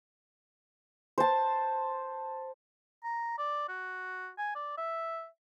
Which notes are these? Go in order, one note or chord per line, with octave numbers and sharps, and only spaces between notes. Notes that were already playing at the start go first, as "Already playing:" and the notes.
C5 A5
A#5
D5
F#4
G#5
D5
E5